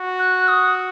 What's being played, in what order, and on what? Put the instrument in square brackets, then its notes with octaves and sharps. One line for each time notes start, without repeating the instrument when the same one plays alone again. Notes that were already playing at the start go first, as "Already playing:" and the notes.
Already playing: [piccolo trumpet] F#4
[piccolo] F#6
D#6